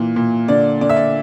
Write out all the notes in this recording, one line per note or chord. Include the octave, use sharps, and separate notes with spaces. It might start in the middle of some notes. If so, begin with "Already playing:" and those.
Already playing: A#2 E3
A#2
D3 D5
D3 D5
E5
D5